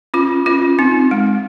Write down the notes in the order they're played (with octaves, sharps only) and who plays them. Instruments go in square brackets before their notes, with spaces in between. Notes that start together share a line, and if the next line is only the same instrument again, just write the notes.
[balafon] C#4 F4
C#4 F4
C4 D#4
G#3